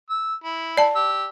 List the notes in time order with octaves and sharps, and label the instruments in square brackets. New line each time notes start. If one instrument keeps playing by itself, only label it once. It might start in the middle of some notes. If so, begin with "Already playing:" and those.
[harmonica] E6
E4
[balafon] D5 A5
[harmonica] G4 E6